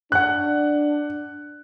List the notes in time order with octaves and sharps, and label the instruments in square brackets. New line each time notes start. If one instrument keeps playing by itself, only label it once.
[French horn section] D4 [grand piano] F#5 F#6